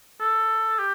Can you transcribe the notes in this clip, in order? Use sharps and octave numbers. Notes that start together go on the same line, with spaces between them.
A4
G4